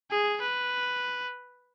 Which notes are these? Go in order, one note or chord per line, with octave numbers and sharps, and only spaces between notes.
G#4
B4